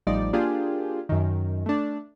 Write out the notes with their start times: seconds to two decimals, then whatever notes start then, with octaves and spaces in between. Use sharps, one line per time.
0.07 A1 F3 G3 D#4 D5
0.33 A#3 D4 F4 G4 G#4
1.09 F#2 D#3
1.66 A3 D4